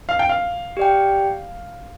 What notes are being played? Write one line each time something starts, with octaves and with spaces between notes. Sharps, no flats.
F5
G5
F5
G4 D5 G5